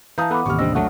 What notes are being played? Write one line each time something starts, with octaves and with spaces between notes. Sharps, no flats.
E3 F5 A5 A#5 D#6 G6
B3 A4 B4 F#5 B5 D6
A1 D#2 C3 C#6 F6
G3 C4 D4 D#5 E6
F#3 A3 F#4 F#5